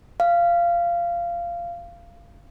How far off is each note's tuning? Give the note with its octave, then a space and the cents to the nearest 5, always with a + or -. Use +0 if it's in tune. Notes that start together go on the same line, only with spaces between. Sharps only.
F5 -15